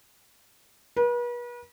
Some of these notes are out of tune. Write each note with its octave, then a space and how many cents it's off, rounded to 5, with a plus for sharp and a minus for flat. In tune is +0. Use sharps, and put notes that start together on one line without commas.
B4 -40